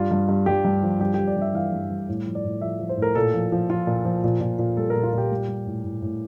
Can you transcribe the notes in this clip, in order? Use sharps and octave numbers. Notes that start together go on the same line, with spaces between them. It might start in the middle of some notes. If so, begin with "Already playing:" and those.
Already playing: G2 F4
G2
G2
G2 G4
G2
F3
G2 G4
G4
G2
D5
G2
E5
E3 F5
G2
G2
A2
F3
D5
A2
F3 E5
F3
C5
A2
A#4
A#2 A4
F3
F3
F3 F4
A#2
F3
A#2
A#2
A#2
G3 A4
A#4
A#2
F4
A#2 G4
G3
G3
A2
A2
A2